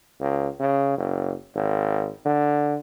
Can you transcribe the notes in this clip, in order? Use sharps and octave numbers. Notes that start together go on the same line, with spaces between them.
C#2
C#3
F#1
G#1
D3